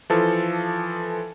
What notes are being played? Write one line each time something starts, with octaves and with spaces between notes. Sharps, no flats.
E3 F3 A4